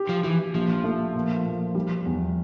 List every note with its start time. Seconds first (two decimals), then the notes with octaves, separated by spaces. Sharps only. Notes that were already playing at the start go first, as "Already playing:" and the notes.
Already playing: G4
0.09 F3
0.23 E3 G4
0.54 A#1 F3
0.84 A3
1.15 A#2
1.45 A#2
1.75 G3
2.06 E2